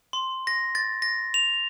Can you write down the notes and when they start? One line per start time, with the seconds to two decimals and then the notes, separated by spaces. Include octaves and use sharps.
0.13 C6
0.47 A#6
0.75 A6
1.02 A#6
1.34 F7